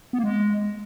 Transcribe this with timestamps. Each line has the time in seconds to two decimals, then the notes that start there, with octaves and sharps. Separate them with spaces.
0.13 B3
0.18 A#3
0.24 G#3